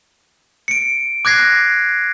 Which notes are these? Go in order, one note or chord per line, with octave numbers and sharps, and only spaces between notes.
C#7 D7
D6 F#6 G#6 A#6 C7